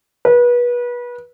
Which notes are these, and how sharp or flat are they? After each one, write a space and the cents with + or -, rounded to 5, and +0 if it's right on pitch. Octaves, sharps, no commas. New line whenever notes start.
B4 -30